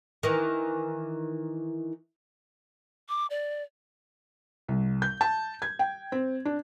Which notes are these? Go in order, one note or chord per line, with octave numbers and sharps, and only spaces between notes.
D#3 E3
D6
D5
C2
G6
A5
G#6
G5
C4
D4